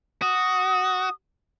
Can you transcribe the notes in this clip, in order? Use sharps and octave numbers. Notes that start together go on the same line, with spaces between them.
F#4 D#6